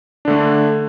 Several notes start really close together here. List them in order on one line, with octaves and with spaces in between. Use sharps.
D4 D3 A3